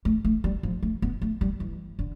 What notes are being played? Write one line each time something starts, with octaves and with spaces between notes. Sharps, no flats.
A3
A3
G3
F3
A3
B3
A3
G3
E3
D3